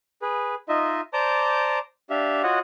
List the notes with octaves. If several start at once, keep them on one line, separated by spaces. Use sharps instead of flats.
G#4 B4
D#4 F4 D#5 E5
C5 D5 A5 A#5 D6 G6
D4 G4 E5 F5
F4 F#4 C#5 D#5 F#5